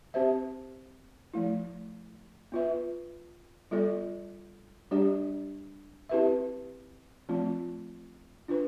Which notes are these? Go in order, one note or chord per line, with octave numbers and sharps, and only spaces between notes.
C4 G4 C5 E5
F3 A3 E4
B3 F4 B4 E5
G3 B3 F4 A4 D5
G3 D4 G4 D5
C4 E4 G4 B4 E5
F3 A3 C4 F4
D4 F4 B4